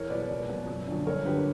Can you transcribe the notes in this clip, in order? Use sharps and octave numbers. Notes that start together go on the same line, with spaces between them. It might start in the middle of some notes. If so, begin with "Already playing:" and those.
Already playing: E2 A#4 C#5
B2 F#3 B4 D5
C#2
B2 F#3
F#2
D3 F#3
G2 A#4 C#5
D3 F#3 G4 B4